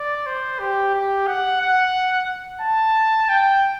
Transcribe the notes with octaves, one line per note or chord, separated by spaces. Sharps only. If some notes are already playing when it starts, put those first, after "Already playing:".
Already playing: D5
C5
G4
G4
F#5
F#5
A5
G5